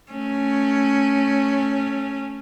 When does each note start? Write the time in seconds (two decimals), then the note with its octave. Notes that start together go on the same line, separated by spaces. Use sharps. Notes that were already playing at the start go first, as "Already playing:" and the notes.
0.11 A3 C#4